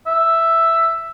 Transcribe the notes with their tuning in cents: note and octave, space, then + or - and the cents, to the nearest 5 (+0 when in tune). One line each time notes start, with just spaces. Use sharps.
E5 +5